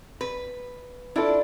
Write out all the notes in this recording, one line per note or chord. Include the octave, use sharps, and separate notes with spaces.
B4
D4 E4 F4 A4